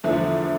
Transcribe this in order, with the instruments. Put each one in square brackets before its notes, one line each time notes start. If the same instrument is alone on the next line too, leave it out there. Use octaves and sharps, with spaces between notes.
[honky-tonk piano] E2 D3 F3 A3 E4